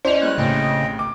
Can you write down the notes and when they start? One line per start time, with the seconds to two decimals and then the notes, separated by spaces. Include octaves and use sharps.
0.05 C#4 E4 C5 D5 D#5 F7
0.22 G3 G#3 A#3 F#6
0.38 A1 C#3 C4 D#5 G5
0.99 D6